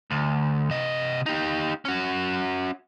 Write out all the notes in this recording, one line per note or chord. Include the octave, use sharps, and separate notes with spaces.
D2
C3 D#5
D#4 G4
C#4 F#4